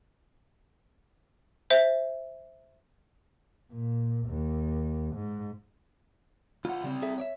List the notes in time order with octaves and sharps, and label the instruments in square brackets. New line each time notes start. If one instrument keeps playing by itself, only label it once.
[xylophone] C5 E5
[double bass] A#2
D#2
G#2
[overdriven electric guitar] C#2 F#5 [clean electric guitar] F4
[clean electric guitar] C#3 [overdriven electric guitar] G3 C4
[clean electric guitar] G#4 A4 E5
C#5 D5 E5